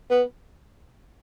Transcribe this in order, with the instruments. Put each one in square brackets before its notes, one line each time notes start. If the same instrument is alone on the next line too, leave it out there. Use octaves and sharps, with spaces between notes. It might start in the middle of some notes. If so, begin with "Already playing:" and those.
[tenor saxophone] B3